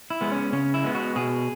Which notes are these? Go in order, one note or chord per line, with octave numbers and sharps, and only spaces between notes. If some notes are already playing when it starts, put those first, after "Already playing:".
E4
G#3 B3
C#4
C#3 C#4
E4
G#3 B3
F#4
B2 G#4